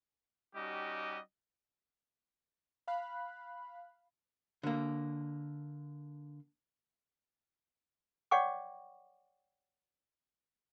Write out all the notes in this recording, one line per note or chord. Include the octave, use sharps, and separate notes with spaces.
G3 C#4 D#4 F#4 G4 D#5
F5 B5 F#6
D3 A#3
C#5 D5 F#5 G5 C#6 D6